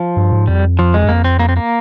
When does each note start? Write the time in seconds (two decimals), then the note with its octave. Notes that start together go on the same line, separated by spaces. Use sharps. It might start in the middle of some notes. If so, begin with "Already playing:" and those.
Already playing: F3
0.16 G2
0.32 G#2
0.48 F2 G3
0.79 F3
0.94 G#3
1.04 G2
1.09 F2 A#3
1.24 C4
1.39 A#3
1.49 C4
1.57 A#3